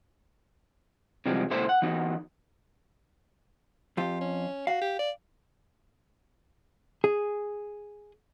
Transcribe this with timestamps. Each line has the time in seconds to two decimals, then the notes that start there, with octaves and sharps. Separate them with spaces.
1.26 C3 E3 F3 G3 G#3
1.50 C#2 A#2 E4 A4 C5 E5
1.69 F#5
1.82 E3 B3 D#4 F#4
3.97 F2 F4 G4
4.21 C#4
4.67 F#4 F5
4.81 G4
4.99 D5
7.04 G#4